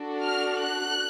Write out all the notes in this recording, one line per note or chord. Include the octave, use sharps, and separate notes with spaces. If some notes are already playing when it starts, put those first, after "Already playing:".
Already playing: D4 F#4 A4
F6
F#6